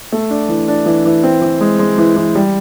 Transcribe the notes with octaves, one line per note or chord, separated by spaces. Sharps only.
A3
D4
E3
D4
E3
E3
C4
E3
G#3
G#3
E3
E3
G3